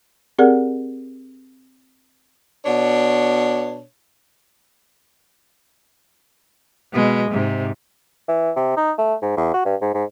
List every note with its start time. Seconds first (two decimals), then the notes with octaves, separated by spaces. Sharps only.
0.39 C4 G4 G#4 A#4 D5 F#5
2.65 B2 D4 C#5
6.93 B2 G#3
7.31 G#2 C3
8.28 E3
8.56 C3
8.77 D#4
8.98 A3
9.22 G#2
9.37 E2
9.54 F#4
9.66 G2
9.82 G#2
9.94 G#2